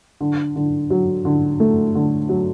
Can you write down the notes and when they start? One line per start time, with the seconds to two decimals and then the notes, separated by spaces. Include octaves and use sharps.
0.21 D3
0.56 D3
0.90 F#3
1.25 D3
1.60 A3
1.95 D3
2.29 F#3